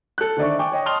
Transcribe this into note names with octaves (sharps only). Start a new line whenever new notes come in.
A4 F#6
D3 D#3 C5 D5 E5 C#6
G5 G#5 C#6 D6
C#5 D#5 G5
A5 C6 D#6 F6 F7 G7